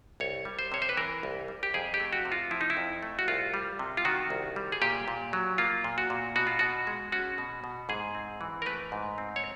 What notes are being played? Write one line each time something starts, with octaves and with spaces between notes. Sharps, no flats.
C2 C#5
G3
C5
C3 C#5
C5
B4
E3 A#4
C2
G3
G4
F2 G#4
G4
A3
F#4
C3
F4
F3 E4
D#4
E4
F2
A3
F#4
C2 F4
G3
C3
F4
D#3 F#4
C2
G3
G#4
A#2 G4
A#2
F#3
A#3 F4
A#2
F#4
A#2
B2 F#4
F4
B2 F#4
G#3
C#4 F#4
B2
B2
G#2 G#4
C4
E3
A#4
A3 B4
G#2
C4
C#5